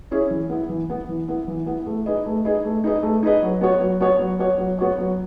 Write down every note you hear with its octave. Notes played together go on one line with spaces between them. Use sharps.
C#4 E4 G#4 C#5
E3
B3 E4
E3
B3 E4
E3
B3 E4
E3
B3 E4
A3
D#4 G#4 B4 D#5
A3
D#4 G#4 B4 D#5
A3
D#4 G#4 B4 D#5
A3
D#4 G#4 B4 D#5
F#3
B3 F#4 C#5
F#3
B3 F#4 C#5
F#3
B3 F#4 C#5
F#3
B3 F#4 C#5
F#3